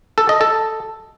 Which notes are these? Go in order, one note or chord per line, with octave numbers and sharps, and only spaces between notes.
A4
D#5
A4